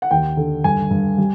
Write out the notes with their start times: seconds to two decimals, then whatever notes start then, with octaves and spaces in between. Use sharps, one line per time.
0.02 F#5
0.11 D#2 G5
0.37 D3
0.64 G2 G#5
0.91 G2
1.18 G3